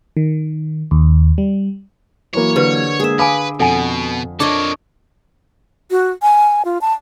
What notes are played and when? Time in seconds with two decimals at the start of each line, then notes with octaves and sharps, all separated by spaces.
0.17 D#3
0.91 D#2
1.38 G3
2.34 E3 F#3 A#3 C#5
2.56 D3 G4 A#4 B4
3.00 G#3 A#3 G#4 E5
3.19 B4 F5 G#5 B5 D6 D#6
3.60 F2 B2 A4 F#5 G#5
4.40 A#3 D4 A4 C#5 D#5 D6
5.91 F#4
6.22 G#5
6.65 F4
6.82 A5